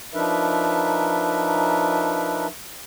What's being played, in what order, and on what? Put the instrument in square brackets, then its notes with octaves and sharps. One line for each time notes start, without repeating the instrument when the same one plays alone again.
[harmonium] F3 D4 D#4 A#4 B4 E5